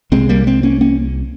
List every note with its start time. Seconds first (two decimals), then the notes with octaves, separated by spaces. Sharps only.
0.12 C2 C3 G#3 C4
0.29 G3 A#3
0.47 G#3 C4
0.63 A#3 C#4
0.81 A#3 C#4